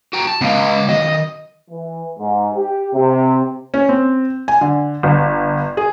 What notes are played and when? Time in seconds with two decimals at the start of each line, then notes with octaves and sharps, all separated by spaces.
0.13 F#4 G5 A#5
0.27 A5
0.41 C#2 B3 F5
0.89 D#3 F#3 D#5
1.70 E3
2.18 G#2
2.54 G4
2.93 C3
3.74 C#4
3.89 C4
4.48 G#5
4.61 D3
5.03 G1
5.77 G#4